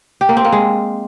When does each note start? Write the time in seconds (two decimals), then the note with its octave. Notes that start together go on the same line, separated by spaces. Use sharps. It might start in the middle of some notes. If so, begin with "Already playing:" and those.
0.21 G4
0.29 A#3
0.37 C4
0.45 A#3
0.52 G#3